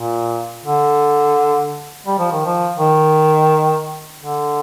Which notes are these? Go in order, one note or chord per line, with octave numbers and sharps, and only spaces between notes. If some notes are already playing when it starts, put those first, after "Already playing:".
Already playing: A#2
D3
G3
F3
D#3
F3
D#3
D3